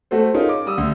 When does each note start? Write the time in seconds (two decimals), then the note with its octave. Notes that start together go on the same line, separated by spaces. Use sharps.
0.11 A3 F#4 A4 C5
0.34 C#4 D#4 F4 G#4 A#4
0.49 D6
0.66 G3 D#6 E6
0.78 D2